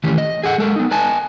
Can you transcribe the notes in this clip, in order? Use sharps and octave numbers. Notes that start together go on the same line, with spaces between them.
D#3 E3 A3 C#4 G4
D#5
G#4 A4 F#5
G#3 A4 A#4
B3 D#4
B4 D#5 G#5 A5